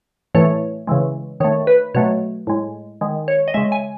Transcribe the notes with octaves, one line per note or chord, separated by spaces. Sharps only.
A2 E3 A3 C#5
C#3 E3 G#3
D#3 A3 C#5
B4
B2 F#3 A3 C#5
A2 G#3
D#3 G#3
C#5
D#5
C#3 G#3 E5
G#5